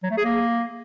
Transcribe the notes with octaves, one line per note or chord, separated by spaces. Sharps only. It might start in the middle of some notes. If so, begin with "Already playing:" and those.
F#3
A3
G#4
A#3